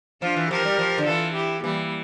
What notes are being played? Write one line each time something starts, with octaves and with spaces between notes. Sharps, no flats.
F3 D4 F4
E3
F3 G4 A#4
G3
F3
D3
E3 F4 A4
E4 G4
E3 G3 A#3